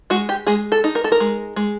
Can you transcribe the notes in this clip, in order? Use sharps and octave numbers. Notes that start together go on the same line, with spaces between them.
G#3 F#4
G4
G#3 G#4
A4
D#4
A#4
A4
A#4
G#3
G#3